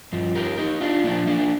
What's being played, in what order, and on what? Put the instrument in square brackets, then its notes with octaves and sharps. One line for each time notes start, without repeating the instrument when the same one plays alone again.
[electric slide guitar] G2 F3
G4 A#4
D#4 G4
D4 F4
A2 F3 A#3 D4
A#3 D4